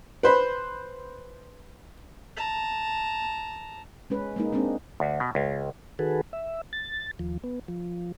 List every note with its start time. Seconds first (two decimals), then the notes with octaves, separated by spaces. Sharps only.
0.23 B4 C5 B5
2.37 A5 A#5
4.10 G#3 C#4 B4
4.36 G#3 A#3 D#4
4.53 G#3 A#3 C4 D4
5.00 D2
5.20 B2
5.35 C#2
5.99 D#3 F#4 G#4 A4 B4
6.33 E5
6.73 A6
7.19 D#2 F3
7.44 B3
7.68 F3